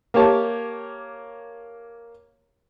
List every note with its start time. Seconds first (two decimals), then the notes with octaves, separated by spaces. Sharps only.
0.14 A#3 G4 C#5 A5